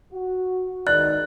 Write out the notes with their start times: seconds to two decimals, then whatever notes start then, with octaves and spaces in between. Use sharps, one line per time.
0.13 F#4
0.87 G#2 B2 D#3 D5 F#6